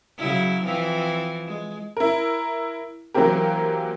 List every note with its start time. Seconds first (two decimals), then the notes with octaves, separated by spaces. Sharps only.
0.18 C#3 F#3 E4
0.65 E3 F3 C4
1.47 G#3
1.97 E4 A#4
3.14 E3 F#3 A#3 C4 G4 A#4